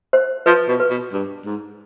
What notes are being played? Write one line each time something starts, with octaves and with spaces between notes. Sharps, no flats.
C5
F3 B4
B2
B4
B2
G2
G#2